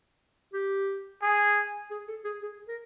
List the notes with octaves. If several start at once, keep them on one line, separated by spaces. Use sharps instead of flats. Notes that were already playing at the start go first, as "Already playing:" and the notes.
G4
G#4
G#4
A4
G#4
G#4
A#4